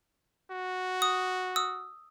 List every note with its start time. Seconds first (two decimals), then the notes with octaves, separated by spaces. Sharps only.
0.51 F#4
1.02 D#6
1.56 D#6 E6